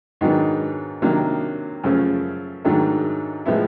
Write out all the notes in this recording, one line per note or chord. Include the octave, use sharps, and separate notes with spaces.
G#2 D#3 F#3 B3 D4
C3 D#3 F#3 A#3 D4
F#2 C#3 F3 A3
G#2 D#3 F#3 A3 D4
A2 F3 G#3 B3 E4